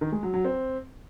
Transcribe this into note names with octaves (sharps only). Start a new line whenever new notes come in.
D#3
G#3
F#3
F#3
C4